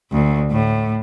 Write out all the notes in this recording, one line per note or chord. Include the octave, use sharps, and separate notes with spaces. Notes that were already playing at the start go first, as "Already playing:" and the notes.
D2
A2